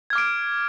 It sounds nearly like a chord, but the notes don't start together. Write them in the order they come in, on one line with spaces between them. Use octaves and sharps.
G#6 F6 D6 D7